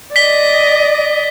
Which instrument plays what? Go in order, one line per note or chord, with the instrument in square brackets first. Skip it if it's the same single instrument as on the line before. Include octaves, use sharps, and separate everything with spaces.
[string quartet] D5 D#5 [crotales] B6 G7